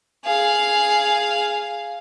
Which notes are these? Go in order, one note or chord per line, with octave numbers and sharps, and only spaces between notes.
G#4 F5